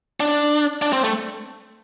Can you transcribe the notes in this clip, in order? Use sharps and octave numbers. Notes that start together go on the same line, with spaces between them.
D4
D4
C4
A3